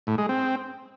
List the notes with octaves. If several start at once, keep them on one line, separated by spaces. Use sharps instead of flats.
A2
G#3
C4